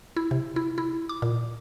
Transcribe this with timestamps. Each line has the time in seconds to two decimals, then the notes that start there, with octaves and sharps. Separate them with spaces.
0.17 E4
0.31 C3
0.56 E4
0.78 E4
1.09 D6
1.22 A#2